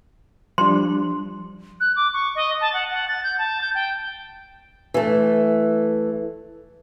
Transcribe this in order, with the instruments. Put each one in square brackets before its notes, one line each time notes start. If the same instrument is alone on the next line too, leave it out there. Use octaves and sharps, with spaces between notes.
[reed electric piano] F3 G3 D4 [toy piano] C6
[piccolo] F#6
D6
C#6
D#5
A5
F#5
F#5
A6
G6
A5
G6
G5
[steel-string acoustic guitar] E3 A3